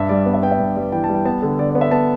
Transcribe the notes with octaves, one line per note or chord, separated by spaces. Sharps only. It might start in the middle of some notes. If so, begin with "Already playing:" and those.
Already playing: G2 E5
G3 D5
B3
E5
B3 G5
E5
G2
G3
E3 G5
A5
G3
G5
B3 A5
D3 A4
D3 D5
D5
B3
E5
B3 A5